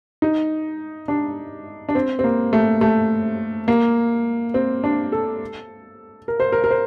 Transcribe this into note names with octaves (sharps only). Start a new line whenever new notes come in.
D#4
D4
D4
C4
C4
A#3
A3
A3
A#3
C4
D4
A4
A#4
C5
A#4
A#4
C5